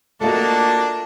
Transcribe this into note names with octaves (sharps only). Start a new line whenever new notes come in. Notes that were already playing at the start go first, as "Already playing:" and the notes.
A3 A#3 D4 F4 F#4 A4 D#5